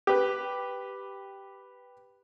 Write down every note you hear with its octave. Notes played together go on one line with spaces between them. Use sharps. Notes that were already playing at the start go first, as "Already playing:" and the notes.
G4 B4